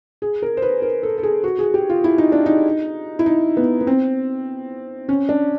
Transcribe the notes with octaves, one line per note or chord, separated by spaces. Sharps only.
G#4
A#4
C5
B4
A#4
A4
A4
G#4
F#4
G#4
G4
F4
E4
D#4
D4
D#4
E4
D#4
B3
B3
C4
C#4
D4